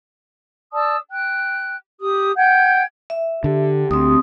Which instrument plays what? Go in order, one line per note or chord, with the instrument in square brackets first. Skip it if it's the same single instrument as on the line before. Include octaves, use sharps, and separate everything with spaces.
[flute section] D5 A5 D#6 E6
G5 F#6
G4 D#6
F#5 G5 G6 G#6
[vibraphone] E5
[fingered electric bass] D3 [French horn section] G4
[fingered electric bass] D2 [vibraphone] C4 D#6